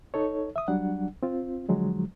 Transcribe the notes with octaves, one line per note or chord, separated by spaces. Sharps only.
D#4 A4 C#5
E5 D#6
F#3 G3 D4 F#5
C4 F4
D3 F3 F#3 G#3